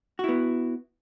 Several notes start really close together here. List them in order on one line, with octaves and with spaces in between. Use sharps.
F#4 E4 B3